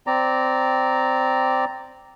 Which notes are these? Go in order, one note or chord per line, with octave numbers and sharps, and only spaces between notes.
C4 D5 A#5